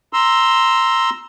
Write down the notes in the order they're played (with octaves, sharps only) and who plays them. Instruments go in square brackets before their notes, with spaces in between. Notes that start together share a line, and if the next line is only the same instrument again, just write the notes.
[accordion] A#5 C6 E6